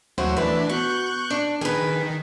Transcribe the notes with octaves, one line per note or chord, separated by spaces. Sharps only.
D#2 A2 F#3 F#4 C5
E3 A3 D4 B4
B2 C#6 F#6 G6
D4
D#3 G#4 B4